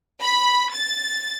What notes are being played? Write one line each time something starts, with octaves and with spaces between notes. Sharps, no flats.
B5
A6